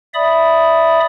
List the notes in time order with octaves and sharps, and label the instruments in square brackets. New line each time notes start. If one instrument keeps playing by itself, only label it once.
[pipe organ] D5 E5 B5 D#6